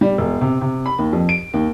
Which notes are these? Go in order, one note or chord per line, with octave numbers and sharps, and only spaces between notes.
G3
E1
C3
C3
B5
D#2
F2
D7
D#2